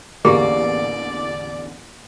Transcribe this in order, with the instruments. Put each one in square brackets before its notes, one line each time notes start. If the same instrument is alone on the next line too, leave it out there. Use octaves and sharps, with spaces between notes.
[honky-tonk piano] A1 E2 D3 [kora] A#3 [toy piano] G4 G#4 [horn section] D5